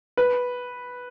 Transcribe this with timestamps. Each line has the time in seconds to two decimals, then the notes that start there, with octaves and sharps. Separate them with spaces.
0.17 B4